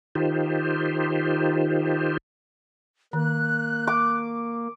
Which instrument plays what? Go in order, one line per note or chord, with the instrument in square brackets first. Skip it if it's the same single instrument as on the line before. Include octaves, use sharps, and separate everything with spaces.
[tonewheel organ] D#3 D#4 F4 G4 C5
[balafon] D#3 [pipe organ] A#3 [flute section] F#6
[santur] D6